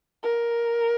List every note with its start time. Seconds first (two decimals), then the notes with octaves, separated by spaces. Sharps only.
0.23 A#4